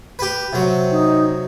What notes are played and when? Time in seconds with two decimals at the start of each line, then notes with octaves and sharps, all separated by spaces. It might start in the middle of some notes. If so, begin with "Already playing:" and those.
0.19 G4 B4
0.53 C3 F#3
0.91 D#4